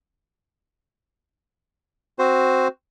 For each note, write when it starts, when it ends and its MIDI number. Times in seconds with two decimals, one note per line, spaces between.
2.19 2.68 60
2.19 2.68 66
2.19 2.68 72